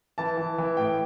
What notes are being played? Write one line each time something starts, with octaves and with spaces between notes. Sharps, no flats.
E3 A5
E3
E3
A2 G5